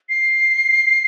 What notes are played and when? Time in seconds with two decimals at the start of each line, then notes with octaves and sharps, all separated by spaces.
0.09 C7